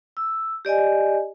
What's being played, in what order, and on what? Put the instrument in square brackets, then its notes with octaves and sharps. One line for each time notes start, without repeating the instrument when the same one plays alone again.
[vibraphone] E6
G4 D5 D#5 G#5